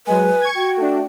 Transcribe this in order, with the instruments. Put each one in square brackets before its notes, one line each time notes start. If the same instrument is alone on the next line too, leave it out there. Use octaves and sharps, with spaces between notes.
[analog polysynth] F#3 G#3 [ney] B4 [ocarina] G#5
[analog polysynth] C#6 G#6
[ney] F#4 [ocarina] G5
[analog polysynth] A3 D4